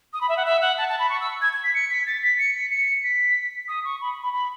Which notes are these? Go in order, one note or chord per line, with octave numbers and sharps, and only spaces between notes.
D#6
B5
E5
F#5
E5
F#5
A5
A5
B5
C#6
E6
G#6
G#6
B6
C#7
B6
A6
B6
C#7
B6
C#7
B6
D#6
C#6
B5
B5
B5